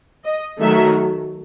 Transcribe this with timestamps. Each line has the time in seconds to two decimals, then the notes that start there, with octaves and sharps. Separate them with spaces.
0.25 D#5
0.61 D#3 F#3 A3 E5